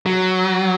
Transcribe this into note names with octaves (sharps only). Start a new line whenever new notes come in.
F#3